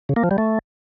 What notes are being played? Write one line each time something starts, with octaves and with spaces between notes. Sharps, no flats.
C#3
A#3
F3
G3
A3